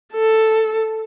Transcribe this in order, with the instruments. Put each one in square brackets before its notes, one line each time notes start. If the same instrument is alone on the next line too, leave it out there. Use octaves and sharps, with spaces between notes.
[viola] A4